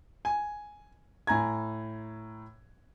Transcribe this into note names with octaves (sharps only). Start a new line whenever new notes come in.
G#5
A2 G#5 A#5 G#6